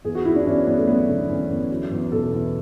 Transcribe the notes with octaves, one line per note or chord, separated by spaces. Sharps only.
E2 G#4
F#4
E2 E4
D4
E2 C#4
E2 B3
A3
F#3 B3
D3
E2 C#4
E2
F#3
E2
B2 A4
E2